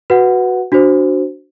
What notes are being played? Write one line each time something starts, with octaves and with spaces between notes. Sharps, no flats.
F#4 B4 F#5
D4 F#4 C5